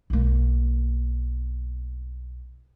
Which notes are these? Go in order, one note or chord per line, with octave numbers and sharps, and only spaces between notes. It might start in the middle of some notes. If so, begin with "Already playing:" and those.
B1 A#3